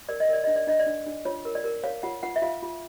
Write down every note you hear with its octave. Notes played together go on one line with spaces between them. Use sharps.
A#4 D5
D#5
A#4 D5
D4 D#5
D5
D4 D#5
D5
D4
D4
F4 C#5
A#4
D5
A#4
C#5 F5
F4 F#5
F4 F#5
E5
F4 F5
F4